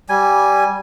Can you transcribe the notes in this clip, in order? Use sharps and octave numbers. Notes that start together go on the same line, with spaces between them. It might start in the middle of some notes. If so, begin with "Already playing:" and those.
G3 G#5